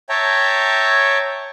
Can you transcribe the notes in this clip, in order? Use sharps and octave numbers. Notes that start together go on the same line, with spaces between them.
C#5 E5 G5 A5 A#5